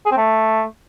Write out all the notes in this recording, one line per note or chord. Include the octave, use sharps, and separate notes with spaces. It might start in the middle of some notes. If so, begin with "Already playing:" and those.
G#4
C4
A3